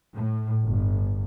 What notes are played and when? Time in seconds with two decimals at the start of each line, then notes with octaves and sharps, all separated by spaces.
0.14 A2
0.63 G1